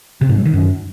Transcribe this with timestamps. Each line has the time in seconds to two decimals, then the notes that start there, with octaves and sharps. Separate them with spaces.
0.21 C3
0.29 G#2
0.37 F#3
0.45 D#3
0.54 F#2